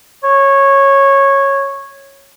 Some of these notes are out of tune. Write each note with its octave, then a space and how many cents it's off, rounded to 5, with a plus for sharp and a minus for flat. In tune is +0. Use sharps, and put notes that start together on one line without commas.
C#5 -10